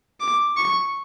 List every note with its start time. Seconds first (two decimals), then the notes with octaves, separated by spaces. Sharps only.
0.20 D6
0.57 C#6